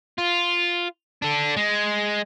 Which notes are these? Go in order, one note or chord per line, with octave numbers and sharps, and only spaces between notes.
F4
D4 A4
G#3